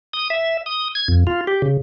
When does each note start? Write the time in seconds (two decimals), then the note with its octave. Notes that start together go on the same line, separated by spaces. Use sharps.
0.13 D#6
0.30 E5
0.66 D#6
0.95 G#6
1.08 F2
1.27 F4
1.47 G4
1.62 C#3